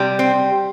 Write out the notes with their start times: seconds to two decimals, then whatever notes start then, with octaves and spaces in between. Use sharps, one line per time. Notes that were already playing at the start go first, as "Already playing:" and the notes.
Already playing: C3 G3
0.19 C4